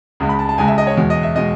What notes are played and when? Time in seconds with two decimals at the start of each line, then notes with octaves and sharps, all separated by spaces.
0.20 C#2 C#3 G#3
0.29 B5
0.39 A5
0.49 A5
0.58 C#2 C#3 G#3 G#5
0.68 E5
0.78 D#5
0.87 C#5
0.97 E2 B2 G#3
1.10 D#5
1.23 E5
1.36 B2 G#3 D#5